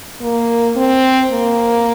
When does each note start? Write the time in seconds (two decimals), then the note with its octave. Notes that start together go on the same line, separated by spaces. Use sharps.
0.21 A#3
0.76 C4
1.32 A#3